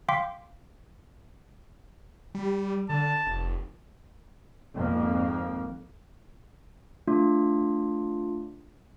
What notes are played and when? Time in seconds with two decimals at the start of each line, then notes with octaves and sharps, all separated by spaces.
0.09 F5 G5 C6 D6 B6
2.35 G3
2.89 D3 A5
3.27 F1
4.76 G#1 F2 A#3
7.07 A3 D4 F4